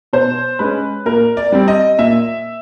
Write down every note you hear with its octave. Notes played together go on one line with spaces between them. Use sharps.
B2 C5
G#3 C#4 B4
A#2 A#4
D5
G3 C4
D#5
A#2 E5